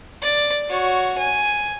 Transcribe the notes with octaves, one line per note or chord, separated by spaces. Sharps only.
D5
F#4 C#5
G#5